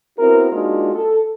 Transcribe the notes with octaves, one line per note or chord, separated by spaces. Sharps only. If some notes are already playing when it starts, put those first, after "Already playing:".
B3 C4 E4 F#4 A#4
G#3 A#3 D4 D#4 F4 F#4
A4